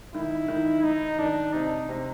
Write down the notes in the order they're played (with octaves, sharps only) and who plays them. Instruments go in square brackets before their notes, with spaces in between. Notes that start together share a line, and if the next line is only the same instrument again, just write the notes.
[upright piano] D#3 [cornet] E4
[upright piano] D#3
[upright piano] D#3 [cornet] D#4
[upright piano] D#3 [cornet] D4
[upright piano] C3 [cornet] D#4
[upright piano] C3